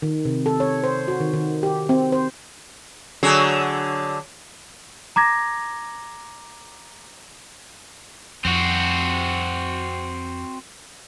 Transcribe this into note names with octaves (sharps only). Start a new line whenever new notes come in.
D#3
C3
A4
C#5
C5
F#4
D#3
D#3
G4
C4
C5
D3 F#3 G#4
A#5 D6 G#6 A#6
F2 C4 F#4